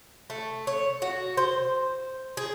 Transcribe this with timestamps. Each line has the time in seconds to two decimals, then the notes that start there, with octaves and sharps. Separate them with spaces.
0.30 A3
0.67 C#5
1.02 F#4
1.37 C5
2.37 G#4